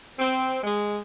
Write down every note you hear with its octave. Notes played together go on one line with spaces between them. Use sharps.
C4
G#3